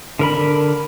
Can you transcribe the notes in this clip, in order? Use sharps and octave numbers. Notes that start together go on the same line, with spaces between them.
D3 A#4 B5